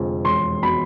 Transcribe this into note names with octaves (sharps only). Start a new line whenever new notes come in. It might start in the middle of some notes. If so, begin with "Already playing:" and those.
Already playing: F1 F2 D3 G#3
E1 C6
B2 B5